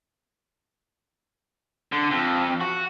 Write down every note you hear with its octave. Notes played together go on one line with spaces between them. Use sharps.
D3
F2
F#4